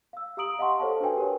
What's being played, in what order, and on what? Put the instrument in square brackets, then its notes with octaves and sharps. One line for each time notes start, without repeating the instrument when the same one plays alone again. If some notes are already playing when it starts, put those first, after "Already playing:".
[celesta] F5 E6
G4 F5 A#5 D#6 D7 F#7
D#5 F5 F#5 A5 C6 C#6
A4 C5 C#5 F5 A5
D4 F#4 A4 B4 G5 G#5
G4 A#4 B4 C#5